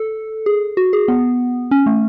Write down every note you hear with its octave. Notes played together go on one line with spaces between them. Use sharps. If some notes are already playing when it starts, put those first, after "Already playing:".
Already playing: A4
G#4
F#4
G#4
B3
C#4
A3